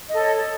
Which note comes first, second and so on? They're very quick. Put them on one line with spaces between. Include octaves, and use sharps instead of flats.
D#5 A4 C#5